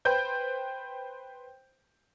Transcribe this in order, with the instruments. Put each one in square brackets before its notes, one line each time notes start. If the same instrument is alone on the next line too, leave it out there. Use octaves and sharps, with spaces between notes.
[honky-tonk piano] B4 C5 G5 G6